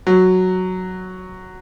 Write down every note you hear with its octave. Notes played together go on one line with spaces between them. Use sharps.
F#3